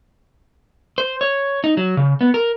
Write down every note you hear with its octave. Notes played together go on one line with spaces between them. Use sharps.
C5
C#5
D#4
F#3
C#3
B3
A#4